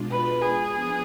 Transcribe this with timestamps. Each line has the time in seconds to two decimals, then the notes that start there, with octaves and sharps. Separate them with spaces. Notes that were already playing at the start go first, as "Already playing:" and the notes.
Already playing: B2 G#3 D4 F4
0.11 B4
0.42 G#4
0.73 F3 B3 D4